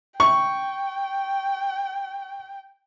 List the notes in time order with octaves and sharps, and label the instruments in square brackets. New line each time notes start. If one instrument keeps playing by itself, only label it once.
[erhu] G5 [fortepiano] C#6